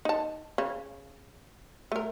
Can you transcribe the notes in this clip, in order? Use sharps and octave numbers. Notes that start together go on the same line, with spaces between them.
D#4 A5
C#3 C#5
A3 A#4